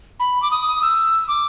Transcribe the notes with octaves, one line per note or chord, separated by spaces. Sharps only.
B5
D6
D#6
E6
D6